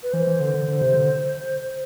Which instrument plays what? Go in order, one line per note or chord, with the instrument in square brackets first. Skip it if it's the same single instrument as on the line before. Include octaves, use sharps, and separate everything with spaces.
[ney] B4
[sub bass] E3 [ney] C5
[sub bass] E3
D3
D3
D3
C3
D3